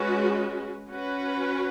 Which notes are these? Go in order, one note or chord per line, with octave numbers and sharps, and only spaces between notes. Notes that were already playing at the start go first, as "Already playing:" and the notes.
Already playing: G#3 C#4 F#4 B4
C#4 F#4 B4